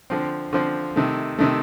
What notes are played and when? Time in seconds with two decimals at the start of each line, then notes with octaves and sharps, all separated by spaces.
0.10 D3 F3 C4
0.53 D3 F3 C4
0.96 C3 D#3 A3
1.39 C3 D#3 A3